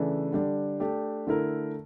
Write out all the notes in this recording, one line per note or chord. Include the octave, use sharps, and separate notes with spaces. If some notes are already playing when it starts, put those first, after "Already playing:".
Already playing: C#3 E3 A3 D4
D3 G3 D4
A3 D4 G4
D3 A3 E4 A#4